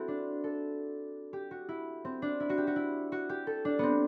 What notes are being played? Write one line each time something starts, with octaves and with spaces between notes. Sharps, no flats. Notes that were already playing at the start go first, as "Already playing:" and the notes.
Already playing: C4 E4 F#4 A4
D4
A4
G4
F#4
E4
C4
D4
E4
F#4
G4
F#4
E4
F#4
G4
A4
D4
B3 C4